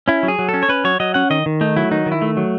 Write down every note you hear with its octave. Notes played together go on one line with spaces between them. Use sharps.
C#4 E4
F#3
G#4
F#3
A4
C#4
C#5
C#4 B4
F#3 C#5
F#3 D#5
C#4 F#5
D#3 D#5
D#3
A3 D#4
F#3 E4
D#3 D#4
D#3
E4
A3
F#3